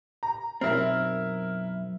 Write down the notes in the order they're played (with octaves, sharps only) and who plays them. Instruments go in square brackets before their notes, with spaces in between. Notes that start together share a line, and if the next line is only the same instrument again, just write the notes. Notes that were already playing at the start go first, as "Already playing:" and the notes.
[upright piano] A#5
[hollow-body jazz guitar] B1 F#2 C4 [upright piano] E4 A#4